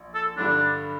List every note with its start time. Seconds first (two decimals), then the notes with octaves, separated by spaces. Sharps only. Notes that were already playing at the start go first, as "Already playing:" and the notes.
Already playing: A#1
0.14 A4
0.37 G2 D3 G3 D4